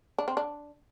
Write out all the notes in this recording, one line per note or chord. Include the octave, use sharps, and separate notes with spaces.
D4
C4
D4